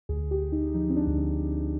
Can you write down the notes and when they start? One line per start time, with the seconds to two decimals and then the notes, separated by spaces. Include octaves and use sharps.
0.09 D2 G#4
0.31 G4
0.42 D2
0.52 D#4
0.74 F3 D#4
0.90 C4
0.96 D4
1.07 D2
1.18 C4